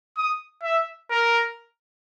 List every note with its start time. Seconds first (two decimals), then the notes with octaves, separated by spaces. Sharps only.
0.17 D#6
0.63 E5
1.11 A#4